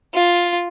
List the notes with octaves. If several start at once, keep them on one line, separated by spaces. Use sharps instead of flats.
F4